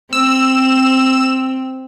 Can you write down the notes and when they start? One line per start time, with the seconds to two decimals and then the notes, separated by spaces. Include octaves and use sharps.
0.13 C4 E6